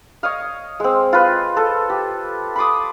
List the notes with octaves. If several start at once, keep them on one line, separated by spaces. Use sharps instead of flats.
C#5 D#5 F5
G#3 C4
F4 B4
A4
G4
B5 C6 D6 D#6